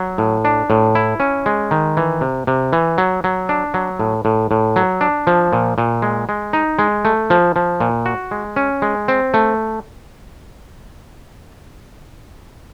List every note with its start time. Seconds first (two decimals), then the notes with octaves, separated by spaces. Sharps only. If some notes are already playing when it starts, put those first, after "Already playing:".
Already playing: F#3
0.18 A2
0.45 D4
0.70 A2
0.95 E4
1.20 C#4
1.46 G#3
1.71 D#3
1.97 E3
2.21 C3
2.47 C3
2.73 E3
2.98 F#3
3.24 F#3
3.49 D4
3.74 F#3
4.00 A2
4.25 A2
4.51 A2
4.76 F#3
5.01 D4
5.27 F3
5.53 A#2
5.78 A#2
6.02 G#3
6.29 G#3
6.53 D#4
6.79 G#3
7.05 A3
7.30 F3
7.56 F3
7.80 A#2
8.06 F#4
8.31 G#3
8.56 C#4
8.82 G#3
9.08 C4
9.34 A3